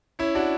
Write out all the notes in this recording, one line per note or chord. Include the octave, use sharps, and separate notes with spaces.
C#4 E4
D4 F#4